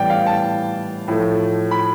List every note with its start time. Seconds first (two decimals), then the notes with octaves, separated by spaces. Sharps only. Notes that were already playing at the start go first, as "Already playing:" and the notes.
Already playing: A2 E3 G3 B3 D5 G5
0.10 F5
0.26 A5
1.08 A2 F3 A3
1.71 B5